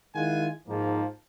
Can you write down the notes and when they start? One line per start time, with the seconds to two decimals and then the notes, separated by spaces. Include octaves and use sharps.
0.15 D#3 G#3 E4 F4 F#5 G#5
0.68 G#2 F3 A#3